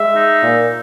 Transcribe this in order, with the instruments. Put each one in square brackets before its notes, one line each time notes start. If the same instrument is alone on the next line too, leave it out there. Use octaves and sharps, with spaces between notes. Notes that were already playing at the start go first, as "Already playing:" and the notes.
Already playing: [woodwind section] G#3 E5
D#4
A#2